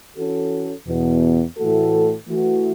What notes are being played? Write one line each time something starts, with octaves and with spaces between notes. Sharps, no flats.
E3 C#4 F#4 A4
E2 B2 B3
A2 E3 A3 F#4 A4
E3 A3 F#4